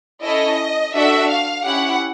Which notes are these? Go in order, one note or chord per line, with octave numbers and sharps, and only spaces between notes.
C#4 E4 A4 D#5
D4 F#4 A4 E5
F5
C#4 E4 G4 F#5